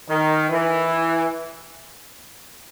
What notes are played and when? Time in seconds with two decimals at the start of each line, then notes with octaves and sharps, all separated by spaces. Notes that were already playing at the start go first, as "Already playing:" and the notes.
0.08 D#3
0.49 E3